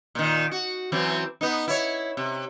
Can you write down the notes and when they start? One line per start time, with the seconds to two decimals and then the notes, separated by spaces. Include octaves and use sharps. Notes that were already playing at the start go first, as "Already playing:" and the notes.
0.15 A#2 D#3
0.51 F#4
0.92 E3 F#3 C4
1.41 B3 D#4
1.68 E4 C#5
2.17 C3